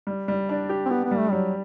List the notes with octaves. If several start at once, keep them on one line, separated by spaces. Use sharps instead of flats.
G3
G3
D4
G4
C4
B3 G4
B3
G3
A3
F#3 G3